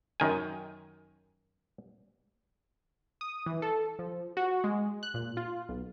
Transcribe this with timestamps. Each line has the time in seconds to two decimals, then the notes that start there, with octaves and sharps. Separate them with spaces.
0.20 F#2 D#3 G#5
3.21 D#6
3.46 E3
3.62 A4
3.99 F3
4.37 F#4
4.64 G#3
5.03 F#6
5.14 A#2
5.37 F4
5.69 B1